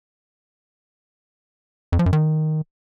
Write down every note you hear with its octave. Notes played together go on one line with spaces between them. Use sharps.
F2
F3
F#2
D#3